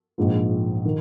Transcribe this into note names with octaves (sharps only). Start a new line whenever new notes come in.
A#1 G#2 F3
D#3